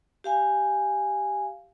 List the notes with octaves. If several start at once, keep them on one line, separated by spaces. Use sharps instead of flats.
G4 F5 G#5